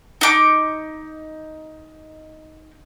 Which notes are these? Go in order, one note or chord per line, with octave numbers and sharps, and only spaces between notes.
D#4 D6